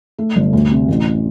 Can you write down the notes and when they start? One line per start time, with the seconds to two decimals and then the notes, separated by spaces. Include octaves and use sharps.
0.18 A3
0.36 G1
0.53 D2
0.71 C3
0.88 A1